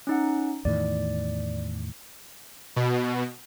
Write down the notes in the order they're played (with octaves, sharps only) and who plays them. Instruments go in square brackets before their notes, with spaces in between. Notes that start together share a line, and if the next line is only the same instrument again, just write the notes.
[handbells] C#4 D#4 F#5
[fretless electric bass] E2 A2 D#3 [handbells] D5
[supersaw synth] B2